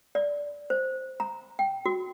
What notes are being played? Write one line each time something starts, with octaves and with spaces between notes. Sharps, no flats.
D5
C5
A#5
G5
F#4